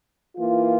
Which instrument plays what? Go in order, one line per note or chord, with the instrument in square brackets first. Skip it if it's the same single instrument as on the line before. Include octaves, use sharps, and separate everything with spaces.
[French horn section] E3 A#3 F4